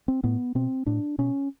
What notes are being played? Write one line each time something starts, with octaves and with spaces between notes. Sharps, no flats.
C4
A2 B3
B2 C4
A2 D4
B2 C#4